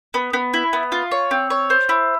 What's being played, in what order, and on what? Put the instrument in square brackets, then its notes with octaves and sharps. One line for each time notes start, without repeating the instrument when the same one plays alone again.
[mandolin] B3
B3
E4
B3
F4
C#5
C4
C#5
C5
E4